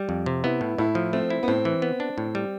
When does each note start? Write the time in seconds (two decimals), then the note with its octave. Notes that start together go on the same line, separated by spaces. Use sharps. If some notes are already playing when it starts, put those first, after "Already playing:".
Already playing: G3
0.09 F2
0.26 C3
0.44 B3 E4
0.61 A2
0.78 A2 E4
0.95 F3
1.13 A3 C4
1.30 E4
1.43 B3
1.48 A2 C4
1.65 E3
1.82 B3
2.00 D4
2.18 A2
2.35 G3